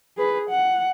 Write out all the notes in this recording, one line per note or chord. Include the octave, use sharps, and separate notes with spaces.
G#4 B4
F#5